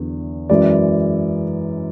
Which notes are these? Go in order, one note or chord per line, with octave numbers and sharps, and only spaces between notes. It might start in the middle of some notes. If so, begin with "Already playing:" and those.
Already playing: E2 D3 F#3
F#2 E3 G#3 D5